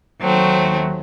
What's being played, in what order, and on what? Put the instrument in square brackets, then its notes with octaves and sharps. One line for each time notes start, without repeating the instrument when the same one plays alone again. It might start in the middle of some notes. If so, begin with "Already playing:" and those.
[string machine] D#2 D#3 [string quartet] F#3 A3 C4